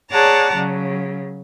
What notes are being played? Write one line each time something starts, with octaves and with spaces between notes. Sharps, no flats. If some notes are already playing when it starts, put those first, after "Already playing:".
G#4 C#5 D5 F#5 A5 A#5
C#3 F#3